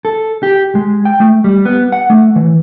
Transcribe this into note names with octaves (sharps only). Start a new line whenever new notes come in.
A4
G4
G#3
G5
A3
G3
B3
F#5
A3
E3